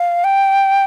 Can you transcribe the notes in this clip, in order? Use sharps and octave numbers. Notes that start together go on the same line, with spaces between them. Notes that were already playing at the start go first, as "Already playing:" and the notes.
Already playing: F5
G5